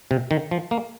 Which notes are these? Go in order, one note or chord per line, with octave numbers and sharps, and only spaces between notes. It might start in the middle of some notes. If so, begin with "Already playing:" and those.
C3
D#3
F3
A#3